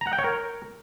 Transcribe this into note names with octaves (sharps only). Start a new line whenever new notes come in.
A#5
F#5
G5
C#5
A#4